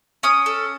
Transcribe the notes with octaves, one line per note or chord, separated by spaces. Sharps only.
C#4 D#6
A4